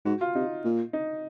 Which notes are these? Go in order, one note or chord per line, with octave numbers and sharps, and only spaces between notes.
G#2 F#4
F4
C3 D#4
A#2
D#4